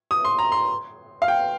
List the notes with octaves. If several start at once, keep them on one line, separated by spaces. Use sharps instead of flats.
D#6
C6
A#5
C6
F5
G5